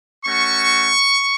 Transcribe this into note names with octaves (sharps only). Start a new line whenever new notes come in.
A3 C#4 F#4 C#6